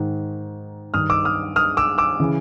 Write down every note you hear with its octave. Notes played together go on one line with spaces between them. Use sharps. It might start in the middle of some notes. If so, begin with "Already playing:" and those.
Already playing: G#2 D#3
G2 D#3 D#6 F6
D6 E6
D#6 F6
D#6 F6
D6 E6
D6 E6
C#3 E3